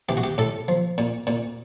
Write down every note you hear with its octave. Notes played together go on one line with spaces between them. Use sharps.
E3 G4
F#4
G4
A2 A4
F3
A#2
A#2